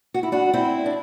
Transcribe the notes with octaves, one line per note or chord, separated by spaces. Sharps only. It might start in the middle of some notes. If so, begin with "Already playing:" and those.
F#4
E4
D4 F#4
C4 E4
D4